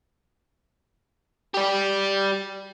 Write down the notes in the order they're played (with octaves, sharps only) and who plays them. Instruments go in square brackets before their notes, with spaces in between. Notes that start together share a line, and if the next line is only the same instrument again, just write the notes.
[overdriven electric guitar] G4 D5